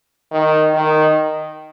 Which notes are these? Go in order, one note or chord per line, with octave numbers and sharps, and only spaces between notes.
D#3
D#3